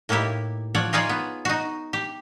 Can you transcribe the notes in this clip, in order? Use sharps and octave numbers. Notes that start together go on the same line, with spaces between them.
A2 A#3 D#4 E4 G4
F3 C#5 D5 F#5
D#4 F4 G#4 C#5 D5
B3
D#4 F#4
G4